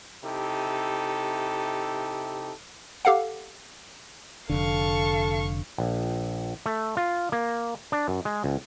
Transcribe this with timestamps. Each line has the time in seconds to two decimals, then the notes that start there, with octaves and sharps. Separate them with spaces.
0.24 C3 D#4 E4 G4 A4
3.05 G4 A4 F5 F#5
4.50 F1 D3 A4 F5 C#6
5.78 A#1
6.66 A3
6.97 F4
7.32 A#3
7.92 D4
8.08 F#2
8.25 G#3
8.44 C#2